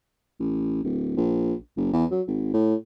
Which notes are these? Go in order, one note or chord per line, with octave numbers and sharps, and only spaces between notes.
A1
D1
A#1
F#1
E2
F#3
G#1
A2